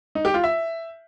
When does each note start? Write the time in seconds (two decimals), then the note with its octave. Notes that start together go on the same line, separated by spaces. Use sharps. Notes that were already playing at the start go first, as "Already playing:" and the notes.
0.15 D#4
0.25 G4
0.34 F4
0.44 E5